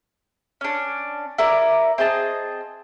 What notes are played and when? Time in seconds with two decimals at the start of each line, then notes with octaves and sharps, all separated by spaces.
0.61 C#4 D4
1.38 E4 A#4 D5
1.98 C4 G#4 D#5 A5